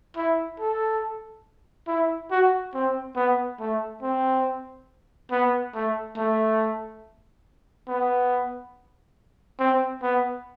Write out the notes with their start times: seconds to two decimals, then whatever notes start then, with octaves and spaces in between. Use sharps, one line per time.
0.17 E4
0.60 A4
1.88 E4
2.31 F#4
2.74 C4
3.16 B3
3.60 A3
4.03 C4
5.31 B3
5.74 A3
6.17 A3
7.88 B3
9.59 C4
10.02 B3